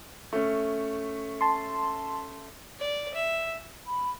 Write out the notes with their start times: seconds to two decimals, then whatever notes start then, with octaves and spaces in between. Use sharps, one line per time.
0.33 A3 C#4
1.41 A5 C6
2.79 D5
3.14 E5
3.87 B5